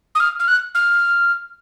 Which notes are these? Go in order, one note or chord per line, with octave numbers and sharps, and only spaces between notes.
D#6
F6
F6
F#6
F6